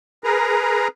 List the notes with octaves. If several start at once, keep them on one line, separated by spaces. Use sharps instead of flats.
G#4 A#4 B4 A#5